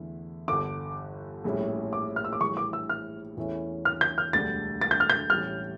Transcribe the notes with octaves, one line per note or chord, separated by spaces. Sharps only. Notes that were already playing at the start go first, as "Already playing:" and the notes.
Already playing: E2 D3 A3 E4
G1 G2 D3 D6
A#1 A2 G3 C#4 E4
D6
F6
E6
D6
A#1 A2 E3 G3 C#6
D6
E6
F6
E2 E3 A3 C#4 E4
F6
G6
F6
E1 D2 D3 G3 D4 A6
A6
G6
F6
G6
A1 A2 G3 F6